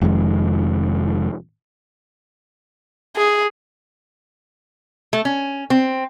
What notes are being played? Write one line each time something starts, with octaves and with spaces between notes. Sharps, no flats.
F1 F2 D#3 G#3
G#4
A3
C#4
C4